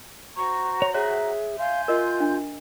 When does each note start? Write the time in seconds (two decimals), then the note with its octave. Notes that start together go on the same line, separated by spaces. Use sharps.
0.36 F#4 C5 A#5 C#6
0.82 C#5
0.94 G#4 C#5 E5 F#6
1.58 F5 G#5 C6 G6
1.88 F4 A#4 D#5
2.20 D4